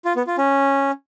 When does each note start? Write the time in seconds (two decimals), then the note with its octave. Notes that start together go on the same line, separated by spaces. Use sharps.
0.05 F4
0.16 B3
0.27 F4
0.38 C#4